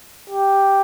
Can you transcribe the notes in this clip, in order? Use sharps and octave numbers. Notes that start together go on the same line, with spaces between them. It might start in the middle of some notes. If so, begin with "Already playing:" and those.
G4